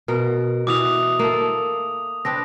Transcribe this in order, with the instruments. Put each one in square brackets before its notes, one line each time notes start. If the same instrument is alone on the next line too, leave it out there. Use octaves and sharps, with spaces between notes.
[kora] B2 A#4
[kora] B2 E3 [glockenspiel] D6 D#6 F7
[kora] A#3 A4
[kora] C4 D4 B4 [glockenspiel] A#6